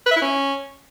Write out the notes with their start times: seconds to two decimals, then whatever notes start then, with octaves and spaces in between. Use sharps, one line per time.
0.06 B4
0.11 E5
0.16 E4
0.22 C#4